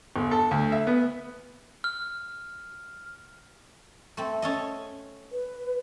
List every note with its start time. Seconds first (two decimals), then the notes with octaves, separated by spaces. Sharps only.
0.16 G1
0.31 A4
0.51 D2
0.72 E5
0.87 B3
1.84 F6
4.17 A3 C4
4.42 C#4 A4 D#5
5.32 B4